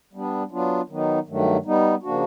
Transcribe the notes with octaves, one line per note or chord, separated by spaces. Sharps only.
G3 B3 D4
F#3 B3 D4 F4
D#3 F#3 B3 D#4
G2 D#3 F#3 A3
G3 B3 D#4
C#3 F3 A#3 D4 F#4